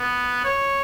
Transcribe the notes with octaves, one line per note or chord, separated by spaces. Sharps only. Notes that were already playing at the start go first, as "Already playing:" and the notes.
Already playing: B3
C#5